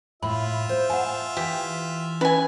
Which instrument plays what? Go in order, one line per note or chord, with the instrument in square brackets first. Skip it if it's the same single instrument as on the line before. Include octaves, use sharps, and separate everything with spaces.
[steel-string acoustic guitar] A2 [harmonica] F4 E5 [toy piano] B5
[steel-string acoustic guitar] C5
[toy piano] F#5 G#5 [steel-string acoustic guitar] A5
[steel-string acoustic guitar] E3 [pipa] G4
[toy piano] C#4 [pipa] B4 G#5